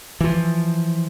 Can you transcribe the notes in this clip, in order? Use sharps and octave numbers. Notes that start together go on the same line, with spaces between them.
E3 F3